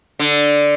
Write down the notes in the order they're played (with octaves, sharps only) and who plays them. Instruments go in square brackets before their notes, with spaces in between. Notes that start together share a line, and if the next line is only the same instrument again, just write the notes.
[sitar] D3